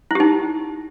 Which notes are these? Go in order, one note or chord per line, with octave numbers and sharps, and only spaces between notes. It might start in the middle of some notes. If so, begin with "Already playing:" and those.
D#4 E4 G4